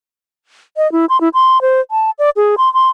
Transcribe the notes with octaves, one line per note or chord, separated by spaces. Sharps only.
D#5
E4
C6
E4
C6
C5
A5
D5
G#4
C6
C6